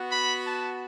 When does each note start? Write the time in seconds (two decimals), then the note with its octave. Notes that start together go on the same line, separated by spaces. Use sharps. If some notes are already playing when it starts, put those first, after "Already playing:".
Already playing: B3 F#4
0.12 B5
0.46 A5